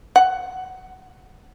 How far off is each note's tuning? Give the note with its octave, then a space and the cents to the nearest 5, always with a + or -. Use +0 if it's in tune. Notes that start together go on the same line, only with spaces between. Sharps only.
F#5 +15